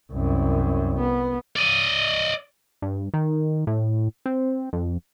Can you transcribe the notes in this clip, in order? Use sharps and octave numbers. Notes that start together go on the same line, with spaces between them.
C2 F#2
B3
D5 D#5
G2
D#3
A2
C4
F2